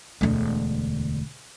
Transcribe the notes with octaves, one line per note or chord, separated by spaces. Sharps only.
E1 D2